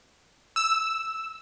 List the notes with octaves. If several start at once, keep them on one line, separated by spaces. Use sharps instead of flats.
E6